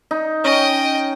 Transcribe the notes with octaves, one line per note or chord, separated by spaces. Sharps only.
D#4
C#4 D#5 G5